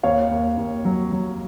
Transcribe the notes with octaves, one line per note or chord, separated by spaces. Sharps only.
D#2 C#5 F5
D#2
D#2
F#3
F#3